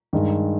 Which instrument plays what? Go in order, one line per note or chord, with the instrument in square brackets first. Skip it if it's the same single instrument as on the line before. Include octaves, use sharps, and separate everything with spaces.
[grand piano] G2 D#3 G#3